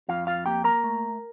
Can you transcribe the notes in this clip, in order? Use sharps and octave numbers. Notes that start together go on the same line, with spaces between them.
F2 F4 F5
F4 F5
A#3 G4 G5
A#4 A#5
A3